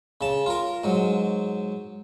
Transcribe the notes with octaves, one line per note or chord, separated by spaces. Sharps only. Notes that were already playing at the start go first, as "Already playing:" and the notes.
C#3 A5
F4 A#4
G#2 F#3